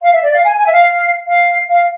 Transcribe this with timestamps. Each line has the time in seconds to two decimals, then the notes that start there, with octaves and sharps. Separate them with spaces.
0.02 F5
0.13 E5
0.23 D5
0.33 F5
0.44 G#5
0.57 G#5
0.65 E5
0.71 F5
1.27 F5
1.68 F5